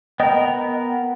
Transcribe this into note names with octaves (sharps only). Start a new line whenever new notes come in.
B3 A#4 D#5 G5